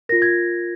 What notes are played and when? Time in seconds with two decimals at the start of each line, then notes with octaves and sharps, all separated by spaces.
0.09 F4 A#4 A#6
0.22 G#6